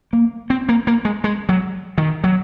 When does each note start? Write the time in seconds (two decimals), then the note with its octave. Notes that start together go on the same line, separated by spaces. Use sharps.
0.13 A#3
0.50 C4
0.69 A#3
0.87 A#3
1.05 G#3
1.24 G#3
1.49 F#3
1.98 D#3
2.24 F#3